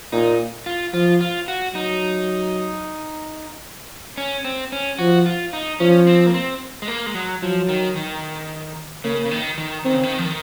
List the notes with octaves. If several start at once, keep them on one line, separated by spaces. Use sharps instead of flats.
A#2 D#4
F4
F3 F4
F4
F#4
F#3 D#4
C#4
C4
C#4
F3 F#4
F4
D#4
F3 C#4
C4
A#3
C4
G#3
A#3
G#3
F#3
F3 F#3
D#3
D#3
C#3 A#3
C#3
D#3
D#3
D#3 C4
C#3
D#3
F3
D#3